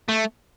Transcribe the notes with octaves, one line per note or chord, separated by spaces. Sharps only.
A3